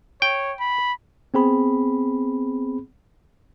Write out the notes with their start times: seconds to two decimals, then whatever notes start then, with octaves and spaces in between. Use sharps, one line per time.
0.22 C#5 G5
0.60 B5
1.34 B3 C4 G#4 B5